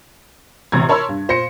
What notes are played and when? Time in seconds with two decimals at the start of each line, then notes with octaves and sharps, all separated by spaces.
0.72 A1 C3 A#5 G#6
0.89 A#4 C#5 A5 B5 C6 E6
1.09 G2
1.29 A#2 C5 A#6 C#7